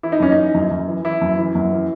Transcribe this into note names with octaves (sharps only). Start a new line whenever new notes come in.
E3 E4
D#4
F#2 C#4
D#4
E3
F#2
F#2
E3
E3 E4
F#2
E3
F#2
E3